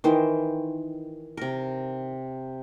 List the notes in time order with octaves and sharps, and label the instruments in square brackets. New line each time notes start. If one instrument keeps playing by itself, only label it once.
[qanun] D#3 E3 C5
C3 A#4